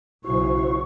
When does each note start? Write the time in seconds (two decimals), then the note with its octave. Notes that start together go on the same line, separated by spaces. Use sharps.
0.24 B1 C#3 E4 F#4 C5 C#6